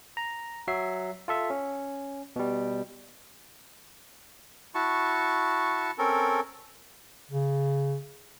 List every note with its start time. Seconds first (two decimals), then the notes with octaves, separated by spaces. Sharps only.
0.17 A#5
0.68 F#3 E5 C7
1.28 F4 A4 E5
1.50 C#4
2.36 B2 G3
4.75 E4 F#4 A5 C#6
5.98 C4 C#4 A4 A#4
7.31 C#3